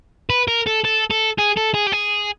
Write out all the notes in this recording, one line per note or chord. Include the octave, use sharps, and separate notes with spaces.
B4
A#4
A4
A4
A4
G#4
A4
G#4
G4
G#4